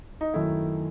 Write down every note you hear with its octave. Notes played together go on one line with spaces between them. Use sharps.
D#4
F#2 D#3 A3 E4